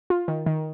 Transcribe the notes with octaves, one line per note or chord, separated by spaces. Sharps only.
F4
D#3
D#3